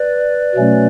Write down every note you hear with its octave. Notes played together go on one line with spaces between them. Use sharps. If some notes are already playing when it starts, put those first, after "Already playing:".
Already playing: B4 D5
B2 F#3 A3 C#4